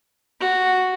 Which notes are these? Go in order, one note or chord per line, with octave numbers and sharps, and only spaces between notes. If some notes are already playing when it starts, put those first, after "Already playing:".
F#4